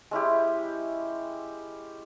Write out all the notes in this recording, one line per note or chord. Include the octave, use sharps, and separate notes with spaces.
G#3 C#4 E4 G4